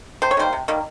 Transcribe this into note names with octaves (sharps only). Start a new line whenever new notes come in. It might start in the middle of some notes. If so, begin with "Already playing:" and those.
C3 C5
C#5
D#3 G3 A#3 C5
C3
D#3 G3 A#3